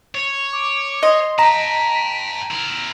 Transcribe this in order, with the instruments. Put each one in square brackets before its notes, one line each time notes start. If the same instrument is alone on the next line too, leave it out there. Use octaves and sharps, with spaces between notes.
[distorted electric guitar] C#5
[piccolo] D6
[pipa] D#5 [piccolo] C6
[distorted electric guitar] G5 A5 [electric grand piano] A#5 [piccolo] B6
[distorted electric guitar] E4 A#4